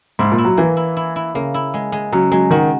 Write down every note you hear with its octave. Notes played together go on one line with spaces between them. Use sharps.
G#2 E4
A#2
E4
F#3
E3 A#3
E4
E4
E4
C#3 A#3
E4
G#3
G#3
C#3 F#3
F#3 G#3
D#3 F#4